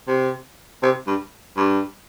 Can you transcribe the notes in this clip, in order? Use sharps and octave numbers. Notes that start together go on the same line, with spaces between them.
C3
C3
G2
G2